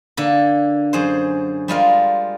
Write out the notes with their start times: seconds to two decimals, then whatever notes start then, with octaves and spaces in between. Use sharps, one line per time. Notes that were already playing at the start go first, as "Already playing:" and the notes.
0.17 D3 A#3 A4
0.93 F#2 G#4 C5
1.68 G3 G#3 F4 A#4